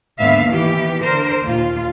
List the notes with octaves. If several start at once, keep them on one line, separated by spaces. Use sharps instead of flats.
D#2 G#2 D3 B3 E5 F5
D#3 E3 B3 G4
D3 A#4 C5
D#2 A#2 F4